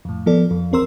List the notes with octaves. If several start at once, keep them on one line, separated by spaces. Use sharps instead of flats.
F2 A2
F3 B3 A4 D5
F2
G#1 E2 C4 A#4 C6 E6